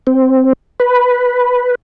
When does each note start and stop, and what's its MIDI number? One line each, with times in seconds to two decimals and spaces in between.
0.07 0.53 60
0.80 1.75 71